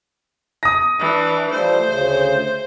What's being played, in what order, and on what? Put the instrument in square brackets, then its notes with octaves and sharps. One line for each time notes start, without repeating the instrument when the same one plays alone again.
[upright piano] D#6 A#6
[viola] E3 D4
[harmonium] F3 G3 A3 [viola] C5
[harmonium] D2 C#3